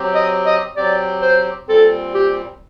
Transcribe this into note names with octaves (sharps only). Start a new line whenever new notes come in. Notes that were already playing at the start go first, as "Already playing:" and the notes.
Already playing: F#3 C4 G4
D#5
D#5
F#3 C4 G4 D5
C5
A#2 G3 C4 A4
G4